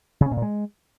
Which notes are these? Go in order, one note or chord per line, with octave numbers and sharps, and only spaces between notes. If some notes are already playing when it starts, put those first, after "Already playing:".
C#3
C#4
B2
A#2
G#3